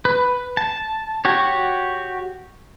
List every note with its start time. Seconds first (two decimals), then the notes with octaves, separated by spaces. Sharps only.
0.05 B4
0.57 A5
1.25 F#4 G4 C#5